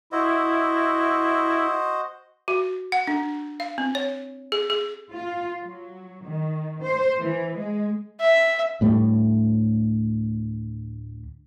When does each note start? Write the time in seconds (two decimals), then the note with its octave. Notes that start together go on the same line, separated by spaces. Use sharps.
0.12 E4 F#4 C5 D#5
2.48 F#4
2.92 F#5
3.07 D4
3.60 F5
3.78 C4
3.95 C#5
4.52 G#4
4.70 G#4
5.13 F4
5.61 F#3
6.28 D#3
6.83 C5
7.21 E3
7.59 G#3
8.20 E5
8.81 D2 A2 G3